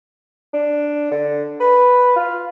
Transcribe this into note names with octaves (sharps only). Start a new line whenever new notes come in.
D4
D3
B4
F4